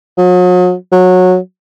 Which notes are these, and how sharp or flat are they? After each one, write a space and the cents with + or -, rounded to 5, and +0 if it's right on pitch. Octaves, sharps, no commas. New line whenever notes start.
F#3 -40
F#3 -15